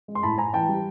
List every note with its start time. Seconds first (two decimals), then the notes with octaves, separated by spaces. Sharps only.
0.08 G#3
0.15 C6
0.23 A2 A5 B5
0.38 A2 G#5 A#5
0.53 E3 G5 A5
0.69 G3